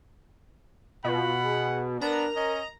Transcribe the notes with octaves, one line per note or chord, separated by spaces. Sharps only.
B2 F4 F#5 B5
G#4
B3 D4 A#4 A#5
C#4 D#5